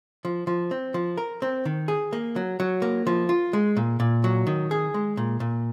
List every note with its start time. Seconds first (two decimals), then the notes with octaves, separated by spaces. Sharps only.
0.25 F3
0.47 F3
0.71 C4
0.94 F3
1.18 A#4
1.42 C4
1.65 D#3
1.88 G#4
2.13 A#3
2.36 F#3
2.60 F#3
2.82 A#3
3.07 F3
3.29 F4
3.53 G#3
3.77 A#2
4.00 A#2
4.24 F#3
4.47 D#3
4.71 G#4
4.94 G#3
5.17 A#2
5.40 A#2